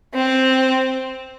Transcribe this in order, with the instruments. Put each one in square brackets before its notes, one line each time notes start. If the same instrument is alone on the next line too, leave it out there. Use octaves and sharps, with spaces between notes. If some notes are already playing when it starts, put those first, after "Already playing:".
[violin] C4